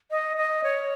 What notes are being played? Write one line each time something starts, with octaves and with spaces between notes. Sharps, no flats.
D#5
D#5
C#5